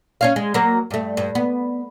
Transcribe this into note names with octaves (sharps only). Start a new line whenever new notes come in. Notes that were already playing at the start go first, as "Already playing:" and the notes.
C#4 C#5 F5
G#3
F#3 A#3 A#4
G2 A3
G2
B3